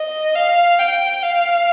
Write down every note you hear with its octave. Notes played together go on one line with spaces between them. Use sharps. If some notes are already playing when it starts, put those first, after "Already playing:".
Already playing: D#5
F5
G5
F5